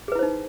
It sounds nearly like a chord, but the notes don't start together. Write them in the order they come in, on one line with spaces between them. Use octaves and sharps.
G#4 B4 E4 C5 D#4